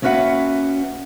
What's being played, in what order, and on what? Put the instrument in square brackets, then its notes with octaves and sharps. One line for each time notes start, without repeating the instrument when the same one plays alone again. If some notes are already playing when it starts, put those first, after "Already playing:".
[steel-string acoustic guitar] A#3 C#4 F#4 B4 E5 F#5